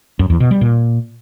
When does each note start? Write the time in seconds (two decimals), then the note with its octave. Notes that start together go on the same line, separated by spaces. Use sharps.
0.19 F#2
0.30 E2
0.40 B2
0.51 G3
0.61 A#2